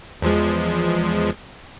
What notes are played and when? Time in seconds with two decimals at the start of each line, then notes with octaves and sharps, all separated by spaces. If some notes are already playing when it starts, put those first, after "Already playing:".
0.22 E2 F3 G#3